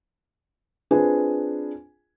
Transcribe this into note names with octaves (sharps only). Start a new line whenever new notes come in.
C4 D4 F4 G#4 B4 G#5